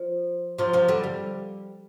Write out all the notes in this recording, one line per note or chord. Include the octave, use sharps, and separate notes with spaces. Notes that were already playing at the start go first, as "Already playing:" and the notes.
Already playing: F3
C3 F3
C3 F3
D3 G3
G3